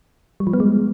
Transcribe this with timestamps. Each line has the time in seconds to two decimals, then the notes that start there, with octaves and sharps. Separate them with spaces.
0.40 G3
0.47 F3
0.53 B3
0.60 G#3